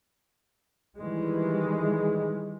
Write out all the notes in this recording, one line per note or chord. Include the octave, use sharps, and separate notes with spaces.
D#3 E3 G3 G#3